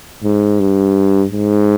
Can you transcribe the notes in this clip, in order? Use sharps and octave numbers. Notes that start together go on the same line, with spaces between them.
G#2
G2
G#2